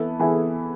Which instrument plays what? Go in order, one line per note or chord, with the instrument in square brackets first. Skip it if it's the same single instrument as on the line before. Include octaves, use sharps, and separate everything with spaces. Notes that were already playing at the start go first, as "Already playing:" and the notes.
Already playing: [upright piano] E3 B3 E4 [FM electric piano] A4
[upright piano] E3 B3 E4 [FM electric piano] G#4